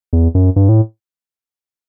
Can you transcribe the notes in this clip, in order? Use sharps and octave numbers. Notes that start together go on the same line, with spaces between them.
E2
F#2
G2
A2